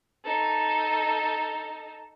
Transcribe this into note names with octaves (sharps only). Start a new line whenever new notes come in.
D#4 A4